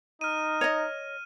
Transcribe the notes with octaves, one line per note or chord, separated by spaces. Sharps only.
D#4 F6 D#7
C#5 D#5